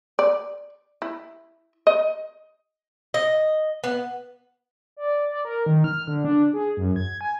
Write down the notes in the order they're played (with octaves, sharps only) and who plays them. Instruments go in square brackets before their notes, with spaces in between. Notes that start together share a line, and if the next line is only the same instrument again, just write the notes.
[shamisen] D5
E4
D#5
[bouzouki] D#5
B3
[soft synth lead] D5
D5
A#4
D#3
F6
D3
D4
G#4
F#2
G#6
G#5